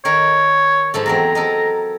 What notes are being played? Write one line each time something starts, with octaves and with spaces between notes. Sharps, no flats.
D#3 A#4 C#5
G#2 F3 A4
E2 F#3 C4 A#5
A4 A#4 D#5